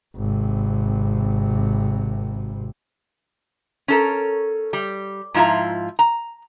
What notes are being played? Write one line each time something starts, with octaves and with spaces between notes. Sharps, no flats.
G#1 C3
C#4 A4 A#4
G3
G#2 F3 E4 F4 E5 A#5
A#5